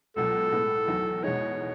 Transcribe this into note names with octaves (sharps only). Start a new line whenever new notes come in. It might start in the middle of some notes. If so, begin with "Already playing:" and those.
C#2 B2 F#3 A4
A2 G#3 B3
E2 D#3 F#3 A3
E2 B2 G#3 D#4 C#5